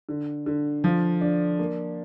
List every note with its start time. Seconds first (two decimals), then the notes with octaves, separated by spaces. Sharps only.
0.09 D3
0.46 D3
0.84 F3
1.21 D4
1.59 A#3